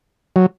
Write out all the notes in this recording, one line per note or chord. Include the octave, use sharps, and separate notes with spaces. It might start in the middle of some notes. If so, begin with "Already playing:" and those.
F#3